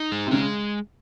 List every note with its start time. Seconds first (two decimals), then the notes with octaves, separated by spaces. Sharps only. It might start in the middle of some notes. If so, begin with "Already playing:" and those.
Already playing: D#4
0.12 G#3
0.27 C3
0.31 C#3 G#3